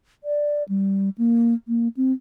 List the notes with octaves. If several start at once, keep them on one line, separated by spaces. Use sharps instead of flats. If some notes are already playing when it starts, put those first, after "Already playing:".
D5
G3
A#3
A#3
C4